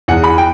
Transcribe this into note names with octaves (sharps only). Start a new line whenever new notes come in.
E2 F#5
B5
G5